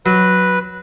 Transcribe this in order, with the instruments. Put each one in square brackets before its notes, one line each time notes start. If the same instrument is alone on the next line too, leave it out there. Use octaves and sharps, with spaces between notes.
[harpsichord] F#3 [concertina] B4